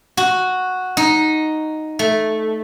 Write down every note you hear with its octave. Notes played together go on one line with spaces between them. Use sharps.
F#4
D#4
A3